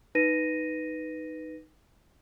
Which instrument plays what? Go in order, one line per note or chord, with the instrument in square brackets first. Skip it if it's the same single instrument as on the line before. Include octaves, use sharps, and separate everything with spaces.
[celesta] D#4 B4 A#6 D#7